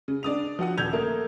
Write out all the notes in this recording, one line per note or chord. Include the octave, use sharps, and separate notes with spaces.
C#3
D4 D5 D#6 F7
F3 F#4 F#5 D#6
D#1 E6 G6 G#6 F7
A3 A#3 A#4